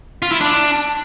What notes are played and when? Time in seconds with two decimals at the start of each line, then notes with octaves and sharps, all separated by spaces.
0.22 F4
0.32 E4
0.41 D4